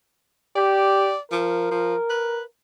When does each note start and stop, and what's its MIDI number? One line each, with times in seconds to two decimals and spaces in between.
0.56 1.14 67
0.56 1.19 74
1.31 1.70 53
1.31 2.43 70
1.71 1.95 53
2.10 2.43 71